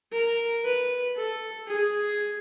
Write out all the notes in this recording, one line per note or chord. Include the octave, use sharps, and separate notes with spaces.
A#4
B4
A4
G#4